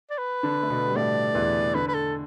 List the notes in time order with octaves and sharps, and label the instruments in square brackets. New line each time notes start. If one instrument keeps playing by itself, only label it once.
[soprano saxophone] D5
B4
[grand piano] D3 D4
A3
B2 B3
G3
[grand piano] A2 A3 [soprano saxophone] D5
[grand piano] E2 E3
[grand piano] D3 [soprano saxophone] B4
[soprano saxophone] B4
A4